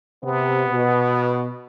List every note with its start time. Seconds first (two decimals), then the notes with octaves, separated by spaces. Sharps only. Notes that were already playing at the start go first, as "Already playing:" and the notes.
0.24 C3 B3
0.68 B2